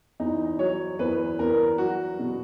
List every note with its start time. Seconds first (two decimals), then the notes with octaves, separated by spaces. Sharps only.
0.20 E2 D#4
0.59 F#3 C#5
0.99 E2 B4
1.39 E2 A#4
1.78 F#3 F#4
2.19 B2